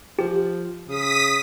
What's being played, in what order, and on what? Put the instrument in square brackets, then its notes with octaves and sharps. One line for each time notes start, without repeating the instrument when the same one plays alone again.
[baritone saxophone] F3 [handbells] G4
[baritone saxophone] C#3 [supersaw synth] D#6 B6